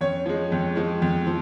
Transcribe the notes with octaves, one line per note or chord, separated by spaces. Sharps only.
F2 C#4 C#5
F3 G#3
F2
F3 G#3
F2
F3